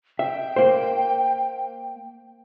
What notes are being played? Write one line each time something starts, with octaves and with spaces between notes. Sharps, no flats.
E5 G5
A#3 C5